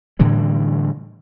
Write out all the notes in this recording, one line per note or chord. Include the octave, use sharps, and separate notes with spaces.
A2 D3 E3 G3